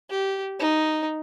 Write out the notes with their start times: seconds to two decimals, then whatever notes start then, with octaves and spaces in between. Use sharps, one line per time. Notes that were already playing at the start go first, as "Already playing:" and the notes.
0.10 G4
0.59 D#4